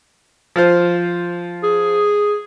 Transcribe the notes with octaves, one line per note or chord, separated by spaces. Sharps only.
F3 F4 C5
G#4